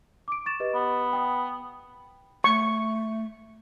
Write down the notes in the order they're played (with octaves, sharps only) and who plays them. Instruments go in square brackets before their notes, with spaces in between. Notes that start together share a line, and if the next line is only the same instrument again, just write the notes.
[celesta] D6 D7
C#6 A6 E7
G4 B4 D#5
[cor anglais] B3
[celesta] G5 D#6
[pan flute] A3 [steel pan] C#6